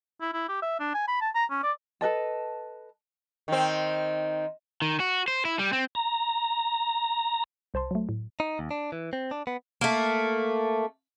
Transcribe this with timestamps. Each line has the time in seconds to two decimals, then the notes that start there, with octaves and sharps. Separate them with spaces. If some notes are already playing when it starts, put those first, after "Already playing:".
0.22 E4
0.33 E4
0.49 G4
0.62 E5
0.80 D4
0.95 G#5
1.08 B5
1.21 A5
1.35 A#5
1.51 C#4
1.63 D5
2.01 A4 B4 D#5 A5
3.48 D#3 C4
4.82 D#3
5.00 F#4
5.28 C5
5.45 E4
5.59 G3
5.73 C4
5.95 A#5
7.74 C2 C5 A5 C6
7.91 F#3 A3
8.09 A2
8.40 D#4
8.59 D#2
8.71 D4
8.92 E3
9.13 C4
9.31 D4
9.47 B3
9.81 A3 A#3